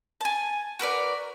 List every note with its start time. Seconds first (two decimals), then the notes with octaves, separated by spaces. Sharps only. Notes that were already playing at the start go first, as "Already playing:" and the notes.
0.21 G#5 A5
0.79 F#4 A#4 B4 D5